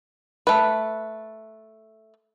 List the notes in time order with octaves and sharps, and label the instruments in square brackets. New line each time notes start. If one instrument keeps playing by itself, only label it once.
[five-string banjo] A3 B4